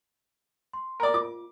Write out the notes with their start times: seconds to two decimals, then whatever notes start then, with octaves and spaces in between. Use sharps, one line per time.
0.73 C6
1.00 A#4 D5
1.14 F4 D6